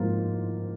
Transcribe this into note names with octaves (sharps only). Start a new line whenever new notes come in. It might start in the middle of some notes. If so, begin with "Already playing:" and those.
Already playing: G#2 F3 A#3 F4